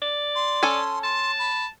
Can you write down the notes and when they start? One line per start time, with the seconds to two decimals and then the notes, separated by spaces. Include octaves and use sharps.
0.02 D5
0.35 C6
0.63 C#4 A4 G#5
1.03 A5 C6
1.39 B5